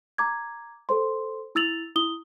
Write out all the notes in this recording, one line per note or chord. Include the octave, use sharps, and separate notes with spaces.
A#5 D6 G#6
A4 C5 C6
E4 E6 A6 F7 F#7
E4 D#6 G7